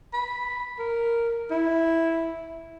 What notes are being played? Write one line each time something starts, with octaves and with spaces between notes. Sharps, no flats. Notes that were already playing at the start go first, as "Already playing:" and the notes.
B5
A#4
E4